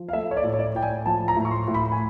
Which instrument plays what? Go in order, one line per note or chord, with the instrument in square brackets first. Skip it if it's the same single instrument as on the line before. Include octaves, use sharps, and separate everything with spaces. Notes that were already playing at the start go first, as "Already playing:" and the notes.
Already playing: [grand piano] F3
F5
A3 E5
C#5
D5
A2
C#5
D5
A2 G5
G#5
F3 A5
A#5
A2
C#6
C6
A2
B5
G#5